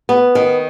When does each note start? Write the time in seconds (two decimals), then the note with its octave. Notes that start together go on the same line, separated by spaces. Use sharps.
0.09 B3
0.35 D#3